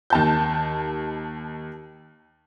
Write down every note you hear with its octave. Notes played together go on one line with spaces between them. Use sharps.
D#2 A5 G6